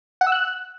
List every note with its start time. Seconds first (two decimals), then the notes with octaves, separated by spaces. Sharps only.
0.21 F#5
0.27 E6
0.32 F#6